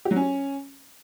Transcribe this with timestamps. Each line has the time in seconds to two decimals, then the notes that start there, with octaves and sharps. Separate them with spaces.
0.05 G4
0.11 F#3
0.16 C#4